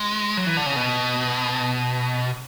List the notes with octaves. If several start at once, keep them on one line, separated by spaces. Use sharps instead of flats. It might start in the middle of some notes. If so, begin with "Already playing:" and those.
Already playing: G#3
F#3
E3
D3
C#3
B2